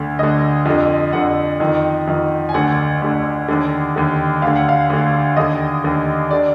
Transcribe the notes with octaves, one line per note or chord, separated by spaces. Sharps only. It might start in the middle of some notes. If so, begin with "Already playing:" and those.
Already playing: D2 D3
D2 D3 D#5
F2 D3
F2 D3 F#5
F2 D#3
F2 D#3
G#5
D2 D3 F#5
D2 D3
D#2 D3
D#2 D3
D2 D3 F5
F#5
F5
D2 D3
D#2 D3 D#5
D#2 D3
D3 D5